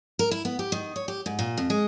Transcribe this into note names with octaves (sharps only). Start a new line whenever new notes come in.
A#4
E4
B3
G4
D#3
C#5
G4
G#2
A#2
F2
G#3